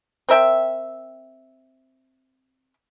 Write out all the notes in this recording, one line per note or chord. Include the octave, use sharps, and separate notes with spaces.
C4 A#4 E5 G5